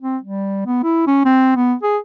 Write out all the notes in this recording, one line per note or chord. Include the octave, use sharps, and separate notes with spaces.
C4
G3
B3
E4
C#4
C4
B3
G#4